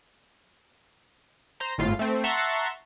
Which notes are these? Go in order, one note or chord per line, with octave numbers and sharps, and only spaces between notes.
C5 A#5
G#1 A2 F4 C7
A3 C4
E5 F#5 A5 A#5 C6 C#6